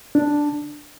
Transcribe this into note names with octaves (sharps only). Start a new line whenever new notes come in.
D4